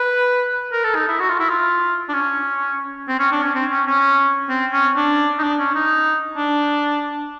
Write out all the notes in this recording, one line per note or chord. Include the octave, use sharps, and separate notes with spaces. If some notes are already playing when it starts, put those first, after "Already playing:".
Already playing: B4
A#4
A4
D#4
E4
F#4
F4
E4
F4
D4
C#4
C4
C#4
D4
C#4
C4
C#4
C#4
C4
C#4
D4
D#4
D4
C#4
D#4
D4